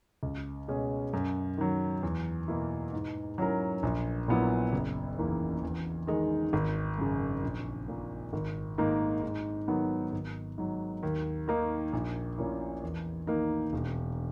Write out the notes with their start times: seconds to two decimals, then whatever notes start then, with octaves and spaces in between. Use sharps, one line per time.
0.23 C#2
0.68 B2 G#3 C#4 G#4
1.13 F#2
1.58 D#3 F#3
2.02 E2
2.48 B2 A#3 E4
2.93 G#2
3.38 F#3 C#4 E4 A#4
3.83 A#1
4.28 A#2 F#3 B3 E4
4.73 F#1
5.18 E2 D#3 A#3 E4
5.63 E2
6.07 D#3 G#3 D#4
6.53 G#1
6.98 F#2 C#3
7.43 A#1
7.88 A#2 A#3
8.33 G#1
8.78 G#2 D#3 A#3 D#4
9.22 G#2
9.68 D#3 F#3 B3
10.13 G#1
10.58 G#2 F#3
11.03 D#2
11.48 D#3 A#3 D#4
11.93 A#1
12.38 A#2 A#3 C#4 E4
12.83 E2
13.27 D#3 A#3 D#4
13.73 E1